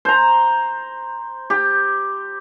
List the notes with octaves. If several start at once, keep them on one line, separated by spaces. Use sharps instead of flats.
C5 A#5
G4